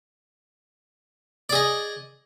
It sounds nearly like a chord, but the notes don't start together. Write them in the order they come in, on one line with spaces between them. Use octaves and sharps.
D5 G#4 D#5